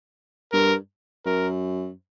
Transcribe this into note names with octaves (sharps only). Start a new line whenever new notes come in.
G2 A#4
F#2 A#4